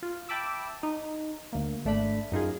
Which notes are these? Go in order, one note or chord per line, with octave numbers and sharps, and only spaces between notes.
F4
E5 G5 A5 B5 D6 E6
D#4
D2 A#3
G#1 A3 D4 B5
F#2 D#4 F4 G#4